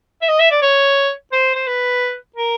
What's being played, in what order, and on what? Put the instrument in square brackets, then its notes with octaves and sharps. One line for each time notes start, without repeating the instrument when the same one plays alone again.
[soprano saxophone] E5
D#5
E5
D5
C#5
C5
C5
B4
A#4